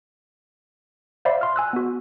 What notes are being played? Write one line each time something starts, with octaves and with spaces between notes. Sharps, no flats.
C5 D5 E5 F5 B5
C6 F6
G#5 E6 F#6
B3 F#4